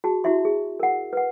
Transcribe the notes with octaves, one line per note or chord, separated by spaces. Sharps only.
F#4 G#4 A5
E4 F#4 G4 E5 C6
G#4
A#4 F#5
B4 F#5